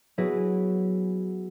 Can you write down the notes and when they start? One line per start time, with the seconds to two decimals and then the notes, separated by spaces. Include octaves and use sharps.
0.18 F#3 B3 E4 G#4 B4 A#6